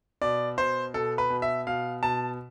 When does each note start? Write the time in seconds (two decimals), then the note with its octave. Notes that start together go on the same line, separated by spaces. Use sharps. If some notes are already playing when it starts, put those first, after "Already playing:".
0.22 B2 D5
0.57 B2 C5
0.94 B2 A4
1.18 B4
1.30 B2
1.42 E5
1.67 B2 F5
2.03 B2 A5